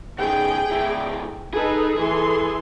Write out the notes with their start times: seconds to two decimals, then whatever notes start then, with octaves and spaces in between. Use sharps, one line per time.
0.19 B2 D#3 G#4 G5
0.71 D2 E4
1.54 D#4 G#4 A4 B4
1.98 E3 A4 C6